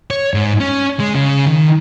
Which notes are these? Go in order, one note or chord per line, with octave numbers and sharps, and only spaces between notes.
C#5
G#2
C#4
G#3
C#3
D#3